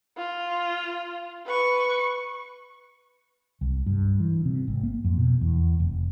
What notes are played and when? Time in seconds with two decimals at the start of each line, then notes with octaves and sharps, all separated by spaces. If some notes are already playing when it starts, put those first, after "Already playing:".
0.17 F4
1.46 B4 C#6
3.61 C2
3.86 G2
4.20 E3
4.45 C3
4.68 G#1
4.83 A#3
5.04 F2
5.18 B2
5.41 E2
5.80 F1